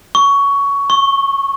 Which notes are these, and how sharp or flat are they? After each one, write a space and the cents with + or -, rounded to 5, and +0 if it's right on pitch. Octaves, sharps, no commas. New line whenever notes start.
C#6 +15
C#6 -15